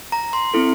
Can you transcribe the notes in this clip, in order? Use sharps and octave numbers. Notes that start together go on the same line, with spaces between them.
A#5
C6
C4 E4 A4